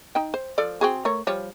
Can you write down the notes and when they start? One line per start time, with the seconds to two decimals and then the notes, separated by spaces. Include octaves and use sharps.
0.15 D#4 G5
0.34 C5
0.58 F3 A4 D5
0.81 C4 F#4 G#4
1.05 A3 A#4 C#5
1.27 F3 G3 C#5